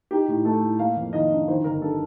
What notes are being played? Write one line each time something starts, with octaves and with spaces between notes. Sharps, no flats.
D#4 G4
A2
A3 A4
A2
A#3 F5
F2
D#3 D#5
D4
D#3 C5
G1 A#4
G2 A4